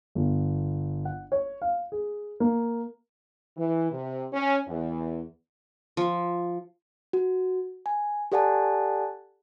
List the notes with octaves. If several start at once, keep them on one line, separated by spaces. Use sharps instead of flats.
G1
F#5
C#5
F5
G#4
A#3
E3
C3
C#4
E2
F3
F#4
G#5
G4 A4 D5 F#5 G#5 A5